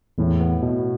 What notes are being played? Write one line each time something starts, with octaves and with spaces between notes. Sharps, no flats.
E2 A2
B3
B2